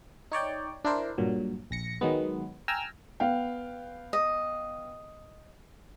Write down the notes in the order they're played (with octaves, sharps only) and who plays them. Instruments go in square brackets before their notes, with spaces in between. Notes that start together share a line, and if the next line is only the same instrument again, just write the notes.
[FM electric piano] D#4 C#5 D5 G5
D4 E4 A#4 C5
G2 A#2 F#3
A#1 A#6 C#7
D#3 F#3 G#3 B3
G5 G#5 A#5 E6 F6
[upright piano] B3 F5 G5
[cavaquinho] D#5